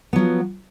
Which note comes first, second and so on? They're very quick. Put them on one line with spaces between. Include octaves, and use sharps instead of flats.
B3 F#3 F3